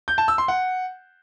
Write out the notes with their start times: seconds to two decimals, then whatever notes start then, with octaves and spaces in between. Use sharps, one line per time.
0.08 G6
0.18 A5
0.28 E6
0.38 C6
0.48 F#5